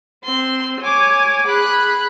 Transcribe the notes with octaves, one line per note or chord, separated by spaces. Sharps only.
C4 C6
C#5 G#5 D6
G#4 B5 F#6